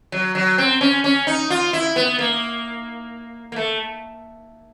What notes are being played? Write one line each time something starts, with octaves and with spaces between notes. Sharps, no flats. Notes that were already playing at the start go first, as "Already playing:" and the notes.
F#3
F#3
C4
C#4
C#4
D#4
F4
E4
B3
A#3
A#3
A3